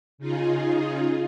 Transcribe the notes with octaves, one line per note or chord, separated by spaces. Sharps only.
C#3 D#4 F4 G#4